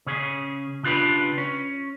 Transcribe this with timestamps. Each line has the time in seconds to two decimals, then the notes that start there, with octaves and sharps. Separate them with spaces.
0.06 C#3 C#4 G#4
0.83 C#3 D4 F4 G4 B4
1.38 C#4